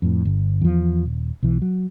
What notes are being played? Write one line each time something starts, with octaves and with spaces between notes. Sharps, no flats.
F2 A2
G1
E2 F3
D#1
B1 E3
F#3